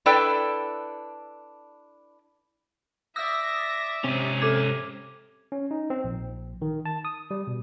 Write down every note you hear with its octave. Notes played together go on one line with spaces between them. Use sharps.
D4 E4 A4 B4 D5 G5
D5 E5 D#6 E6 A#6
G#2 C3 C#4
A4 D6 G#6
C#4
D#4
C4
A#1
D#3
A5
D#6
G3
B2